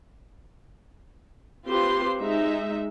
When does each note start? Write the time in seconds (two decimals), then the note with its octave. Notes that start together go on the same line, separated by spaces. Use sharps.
1.66 C4 F4 G4 B4 C5 C6
2.21 G#3 D#4 E5